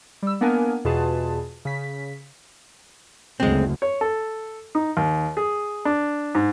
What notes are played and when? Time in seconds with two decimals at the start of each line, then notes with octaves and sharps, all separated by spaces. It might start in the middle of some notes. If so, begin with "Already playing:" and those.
0.22 G3 E6
0.41 A#3 B3 D4 A#4 G#5
0.85 E2 B2 F4 G#4 B4 A5
1.65 C#3 B6
3.40 F#1 D2 G#3 C4
3.82 C#5
4.01 A4
4.75 D#4
4.97 D#2
5.37 G#4
5.85 D4
6.35 G#2